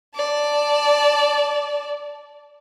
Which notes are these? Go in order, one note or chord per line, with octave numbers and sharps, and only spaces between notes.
D5 A5